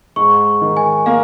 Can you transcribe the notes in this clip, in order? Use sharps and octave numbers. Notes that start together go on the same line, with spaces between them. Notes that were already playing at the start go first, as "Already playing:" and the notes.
G#2 C#6
D#3
G#5
A#3 F5